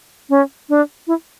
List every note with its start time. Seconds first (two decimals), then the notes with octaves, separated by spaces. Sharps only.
0.30 C#4
0.69 D4
1.07 E4